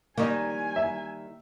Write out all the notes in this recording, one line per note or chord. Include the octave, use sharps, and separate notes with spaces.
D#3 G3 A#3 D#4 C#5 D#5 G#5
E5